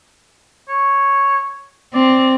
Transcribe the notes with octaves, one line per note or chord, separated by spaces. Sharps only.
C#5
C4 D5